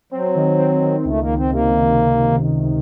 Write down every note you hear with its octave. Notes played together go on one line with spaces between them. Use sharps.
F#3 C4
D#3
C4
D#3
C#2 A3
A#3
C#2
C4
C3 A#3